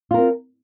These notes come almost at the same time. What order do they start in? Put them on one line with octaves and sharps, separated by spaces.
F4 A#4 C4